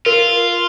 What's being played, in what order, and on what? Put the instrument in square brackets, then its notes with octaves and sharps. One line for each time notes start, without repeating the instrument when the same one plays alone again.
[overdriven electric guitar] F4 [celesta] A#4